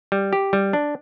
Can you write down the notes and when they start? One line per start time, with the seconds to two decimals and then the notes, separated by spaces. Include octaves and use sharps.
0.12 G3
0.33 G4
0.53 G3
0.73 D4